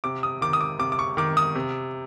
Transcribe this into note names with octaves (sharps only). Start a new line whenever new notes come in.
C3 D6
D#6
D#3 D6
D#6
D6
C3 D6
D6
C#6
D#3 D6
D#6
C3